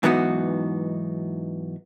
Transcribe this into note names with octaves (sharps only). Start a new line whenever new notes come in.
G#2 E3 F#3 B3 D#4 F#4